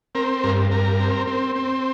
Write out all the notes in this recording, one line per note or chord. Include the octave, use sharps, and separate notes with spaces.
C4 A#4
G2 A#4
G2 A#4
C4
C4
C4